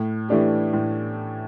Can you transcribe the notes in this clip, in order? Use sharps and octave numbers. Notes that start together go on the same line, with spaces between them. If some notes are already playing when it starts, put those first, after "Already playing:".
Already playing: A2
E3 A3 D4 G4
A2